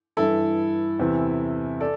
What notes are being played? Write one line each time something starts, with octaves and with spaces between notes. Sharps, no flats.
G2 E3 E4 A4
E2 C3 E3
A4 D5